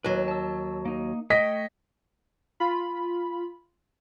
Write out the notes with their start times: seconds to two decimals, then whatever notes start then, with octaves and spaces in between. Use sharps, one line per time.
0.04 D#2 F#3 B4
0.28 A5 E6
0.85 A#3 D#4
1.30 A3 C#5 D#5 G5 B6
2.60 F4 B5